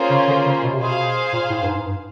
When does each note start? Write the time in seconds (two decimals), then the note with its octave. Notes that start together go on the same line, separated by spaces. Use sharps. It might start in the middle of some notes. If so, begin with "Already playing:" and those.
Already playing: A#3 C#4 F4 G#4 C5
0.10 C#3
0.28 D3
0.46 C#3
0.63 B2
0.72 C3
0.80 B2 G#4 C5 F5
1.33 A#2
1.50 A2
1.63 G2
1.68 G#2
1.85 G2